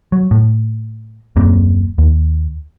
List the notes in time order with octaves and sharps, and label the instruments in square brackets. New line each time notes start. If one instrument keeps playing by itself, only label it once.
[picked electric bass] F#3
A2
D#1 F#2 A#3 C4
D#2